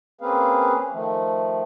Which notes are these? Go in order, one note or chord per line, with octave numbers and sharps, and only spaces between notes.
A#3 C4 C#4 G#4 B4 F5
D#3 F3 A3